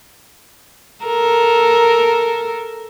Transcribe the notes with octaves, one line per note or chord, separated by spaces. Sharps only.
A4 A#4